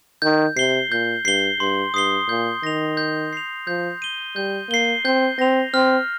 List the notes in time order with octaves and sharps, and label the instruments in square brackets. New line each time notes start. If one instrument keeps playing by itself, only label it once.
[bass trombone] D#3 [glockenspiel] G6
[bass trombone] C3 [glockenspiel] C7 G7
[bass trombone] A#2 [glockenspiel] G6
[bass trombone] G2 [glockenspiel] C7 G7
[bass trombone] G2 [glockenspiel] C6
[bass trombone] G2 [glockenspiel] D#6 C7 G7
[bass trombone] A#2 [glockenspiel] G6
[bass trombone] D#3 [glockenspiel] A#6 F7
[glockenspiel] G6
C7 F7
[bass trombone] F3 [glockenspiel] G6
[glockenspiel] D#7 G7
[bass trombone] G3 [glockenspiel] G6
[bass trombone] A#3 [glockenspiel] C7 G7
[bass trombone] C4 [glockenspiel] G6
[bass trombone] C4 [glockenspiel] A#6 F7
[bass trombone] C4 [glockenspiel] F6